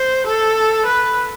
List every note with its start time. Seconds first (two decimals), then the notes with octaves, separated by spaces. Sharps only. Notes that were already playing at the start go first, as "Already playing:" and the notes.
Already playing: C5
0.27 A4
0.86 B4